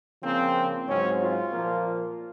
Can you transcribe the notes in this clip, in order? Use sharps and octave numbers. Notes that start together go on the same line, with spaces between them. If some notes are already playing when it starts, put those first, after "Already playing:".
C#3 F3 A#3 C4
G#2 F#3 C4 C#4
F4
A#2 F3 A#3